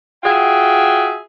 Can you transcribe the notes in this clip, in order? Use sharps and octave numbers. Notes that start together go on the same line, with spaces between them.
F4 F#4 G#4 E5 G5